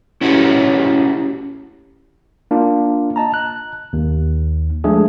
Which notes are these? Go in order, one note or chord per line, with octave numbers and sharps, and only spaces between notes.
C#4 E4 F#4 G4 B4 C#5
A#3 D4 F4
D#5 A5 A#5
F#6
D#2
F3 G#3 A3 D4 G#4